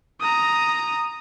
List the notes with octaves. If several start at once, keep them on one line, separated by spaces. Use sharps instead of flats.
A#5 D#6